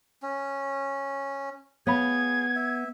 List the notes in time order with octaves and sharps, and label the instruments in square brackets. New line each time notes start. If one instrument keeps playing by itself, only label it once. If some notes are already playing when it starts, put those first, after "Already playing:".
[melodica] C#4
[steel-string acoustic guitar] B3 [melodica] G#4 [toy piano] C#5 F5 B5 [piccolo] G#6
[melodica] E5